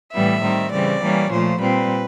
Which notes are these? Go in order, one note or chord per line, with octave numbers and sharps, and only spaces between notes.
A2 E3 G3 B3 E5
D#3 G3 C4
C#3 E3 G3 C4 D5
E3 G3 A#3 C#4
A#2 F3 A3 C5
A#2 G3 C4 B4